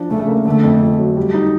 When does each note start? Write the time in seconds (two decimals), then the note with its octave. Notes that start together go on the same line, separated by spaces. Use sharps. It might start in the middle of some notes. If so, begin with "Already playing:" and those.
Already playing: F3 D4
0.10 C#3 A3
0.28 A#3
0.46 D3 A3
0.64 F2
0.82 F2
0.99 F#3
1.17 G3
1.34 D#4